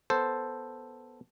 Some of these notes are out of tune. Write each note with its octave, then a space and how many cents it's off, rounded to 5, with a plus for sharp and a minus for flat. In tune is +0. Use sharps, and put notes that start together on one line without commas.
B3 +0 A4 +0 C5 +0